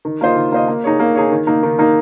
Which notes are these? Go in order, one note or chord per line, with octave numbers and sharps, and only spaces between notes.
D#3
A#3 F4 C5 D#5
D#3
A#3 F4 C5 D#5
A#3
D#4 G#4 C#5
A#3
D#4 G#4 C#5
D#3
A#3 D#4
D#3
A#3 D#4